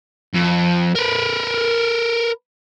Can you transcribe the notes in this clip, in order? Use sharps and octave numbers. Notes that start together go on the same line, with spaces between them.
F2
A#4 B4